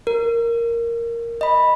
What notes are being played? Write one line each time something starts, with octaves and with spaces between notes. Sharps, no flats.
A#4
D#5 B5